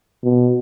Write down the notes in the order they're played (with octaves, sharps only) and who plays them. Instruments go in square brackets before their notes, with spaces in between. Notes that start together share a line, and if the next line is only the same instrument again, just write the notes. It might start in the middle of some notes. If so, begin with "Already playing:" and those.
[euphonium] B2